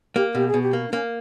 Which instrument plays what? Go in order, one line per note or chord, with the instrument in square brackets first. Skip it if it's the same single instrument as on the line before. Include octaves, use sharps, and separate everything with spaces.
[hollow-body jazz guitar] A#3 [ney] G4
[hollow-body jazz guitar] B2 [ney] G4
[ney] G#4
[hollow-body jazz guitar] B2
[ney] G4
[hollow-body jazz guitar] A#3
[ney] D4
[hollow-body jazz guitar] A#3 [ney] C#4